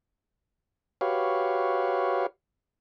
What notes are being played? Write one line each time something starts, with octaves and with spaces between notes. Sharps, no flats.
F#4 G4 B4 C#5 F5